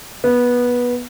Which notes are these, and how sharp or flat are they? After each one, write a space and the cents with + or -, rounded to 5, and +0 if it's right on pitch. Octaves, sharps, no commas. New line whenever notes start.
B3 -15